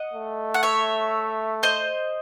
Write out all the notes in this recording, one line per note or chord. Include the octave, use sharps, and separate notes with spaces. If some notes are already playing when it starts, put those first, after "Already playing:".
Already playing: D#5 F#5
A3
F#5
C#5 E5
C5 D#5